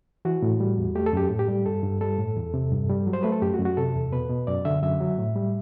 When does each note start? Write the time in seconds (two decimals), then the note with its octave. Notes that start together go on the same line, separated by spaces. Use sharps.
0.25 E3 F#4
0.42 A2
0.60 G3
0.78 E2
0.95 A3 G4
1.06 A4
1.13 F#2 G4
1.28 A2 A4
1.39 G4
1.48 G3
1.66 G2 A4
1.83 G2
2.01 G3 A4
2.18 A2
2.36 E2
2.54 C3
2.72 G2
2.89 G3
3.07 F#3
3.13 C5
3.23 A3 B4
3.32 A4
3.42 F#2 G4
3.54 F#4
3.59 F#2
3.65 F#4
3.77 C3 A4
3.95 E2
4.12 B2 B4
4.30 B2
4.47 F#2 D5
4.65 D3 E5
4.83 F#2 E5
5.00 F#3
5.18 A2
5.35 G3